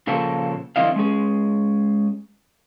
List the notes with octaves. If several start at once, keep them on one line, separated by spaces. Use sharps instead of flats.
A#2 C#3 F3 A#3 A4
D3 E3 C4 E4 D#5 F5
G#3 C#4 G#4